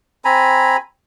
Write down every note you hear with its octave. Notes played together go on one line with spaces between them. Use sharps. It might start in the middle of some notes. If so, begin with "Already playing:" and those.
C4 G#5 A#5 B5